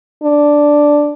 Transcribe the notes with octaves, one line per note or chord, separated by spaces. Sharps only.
D4